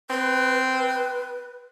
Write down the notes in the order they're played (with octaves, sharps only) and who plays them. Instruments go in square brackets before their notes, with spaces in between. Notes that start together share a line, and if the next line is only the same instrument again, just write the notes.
[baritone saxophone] C4 [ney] B4